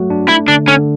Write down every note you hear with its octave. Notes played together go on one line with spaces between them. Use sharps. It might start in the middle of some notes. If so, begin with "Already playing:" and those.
Already playing: F#3 A3 F#4
D4
A3 E4
D3 D4
D3 C#4